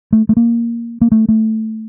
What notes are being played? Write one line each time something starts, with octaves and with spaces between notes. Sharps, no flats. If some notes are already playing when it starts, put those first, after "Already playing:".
A3
A3
A#3
A#3
A3
A3